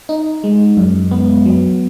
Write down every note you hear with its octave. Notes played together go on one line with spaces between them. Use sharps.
D#4
G#3
F#2
B3
F#3